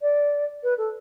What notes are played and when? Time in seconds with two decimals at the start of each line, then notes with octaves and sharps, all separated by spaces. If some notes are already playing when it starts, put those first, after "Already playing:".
0.02 D5
0.63 B4
0.78 A4